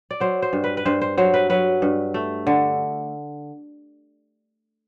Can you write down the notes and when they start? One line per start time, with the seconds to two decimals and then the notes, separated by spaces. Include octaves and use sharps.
0.11 D5
0.20 F#3 C5
0.42 C5
0.53 G2
0.64 B4
0.77 B4
0.85 G2 C5
1.01 C5
1.17 F#3 C5
1.34 B4
1.50 F#3 B4
1.82 G2
2.14 A3
2.47 D3